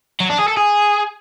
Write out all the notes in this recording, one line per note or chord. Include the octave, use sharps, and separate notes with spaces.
F#3
D4
G#4
A4
G#4